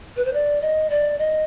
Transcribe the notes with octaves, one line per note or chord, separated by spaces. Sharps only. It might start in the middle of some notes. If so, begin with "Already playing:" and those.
B4
C5
D5
D#5
D5
D#5